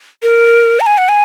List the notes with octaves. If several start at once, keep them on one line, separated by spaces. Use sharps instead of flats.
A#4
A#5
G#5
F#5
G#5